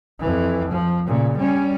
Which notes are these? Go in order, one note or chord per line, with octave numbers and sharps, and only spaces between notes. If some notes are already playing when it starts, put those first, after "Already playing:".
F2 E3
F3
A#2 C#3
G3 C#4